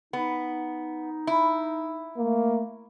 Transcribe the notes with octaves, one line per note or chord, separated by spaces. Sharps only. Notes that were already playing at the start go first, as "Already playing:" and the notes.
B3 D#4
E4
A3 A#3